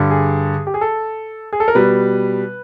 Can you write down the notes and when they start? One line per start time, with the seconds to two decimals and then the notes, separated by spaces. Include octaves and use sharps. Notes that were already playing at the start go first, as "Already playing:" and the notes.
Already playing: G2 D3 G3
0.11 G#4
0.67 G4
0.74 G#4
0.81 A4
1.53 G#4
1.60 A4
1.68 A#4
1.75 B2 G3 B4